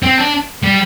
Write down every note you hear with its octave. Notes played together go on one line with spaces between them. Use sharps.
C4
D4
G3